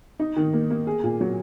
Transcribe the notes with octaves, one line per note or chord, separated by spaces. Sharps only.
D#4
D#3
A#3
A#3
G#4
A#2
F#3